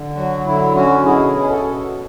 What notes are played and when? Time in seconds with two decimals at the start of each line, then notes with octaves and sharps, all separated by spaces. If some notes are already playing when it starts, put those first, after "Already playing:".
Already playing: D3
0.16 F#3 F#4
0.46 D3 E4
0.75 C#4 F#4
1.05 B2 E4 G#4
1.35 C#4
1.50 F#4 A4
1.65 B2